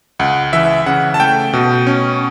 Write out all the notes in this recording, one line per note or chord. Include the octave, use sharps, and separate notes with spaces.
C#2 F#5
E3 E5
C#3 F#5
A5
A3 G5
B2
C#4